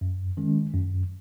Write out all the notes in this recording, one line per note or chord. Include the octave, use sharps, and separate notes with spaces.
F#2
D#3 G#3 C#4
F#2